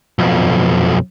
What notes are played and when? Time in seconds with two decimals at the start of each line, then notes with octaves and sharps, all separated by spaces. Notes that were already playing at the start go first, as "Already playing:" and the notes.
0.19 B1 F2